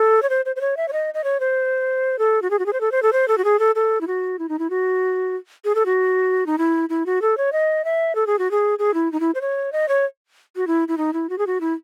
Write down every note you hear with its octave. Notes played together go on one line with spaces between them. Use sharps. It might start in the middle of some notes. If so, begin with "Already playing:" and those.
Already playing: A4
C#5
C5
C5
C5
C#5
E5
C#5
D#5
D#5
C#5
C5
A4
F#4
G#4
F#4
G#4
C5
A4
C5
A4
C5
A4
F#4
G#4
A4
A4
E4
F#4
E4
D#4
E4
F#4
G#4
A4
F#4
D#4
E4
E4
F#4
A4
C#5
D#5
E5
A4
G#4
F#4
G#4
G#4
E4
D#4
E4
C5
C#5
D#5
C#5
F#4
E4
E4
D#4
E4
F#4
G#4
F#4
E4